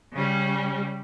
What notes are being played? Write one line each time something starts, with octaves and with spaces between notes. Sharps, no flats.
C#3 G3 C#4